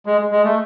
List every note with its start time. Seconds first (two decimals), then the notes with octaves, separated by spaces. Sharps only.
0.06 G#3
0.31 G#3
0.44 A3